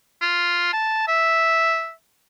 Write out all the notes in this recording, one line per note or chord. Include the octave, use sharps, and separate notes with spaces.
F4
A5
E5